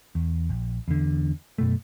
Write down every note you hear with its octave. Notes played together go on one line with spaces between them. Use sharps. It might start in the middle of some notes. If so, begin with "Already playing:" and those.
E2
A#1
E2 D3
F#2 B2 A3